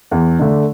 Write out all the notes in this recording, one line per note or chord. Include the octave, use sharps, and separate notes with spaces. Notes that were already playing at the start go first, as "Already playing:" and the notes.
E2
D3 A3 D4